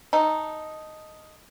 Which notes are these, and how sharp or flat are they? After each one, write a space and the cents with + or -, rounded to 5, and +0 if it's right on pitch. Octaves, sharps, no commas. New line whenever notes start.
D#4 +0 A4 +0